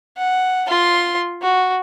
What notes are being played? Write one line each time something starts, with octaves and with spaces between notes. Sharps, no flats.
F#5
F4 C6
F#4